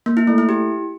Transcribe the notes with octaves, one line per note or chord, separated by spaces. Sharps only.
A#3
E4
A3
E4
G4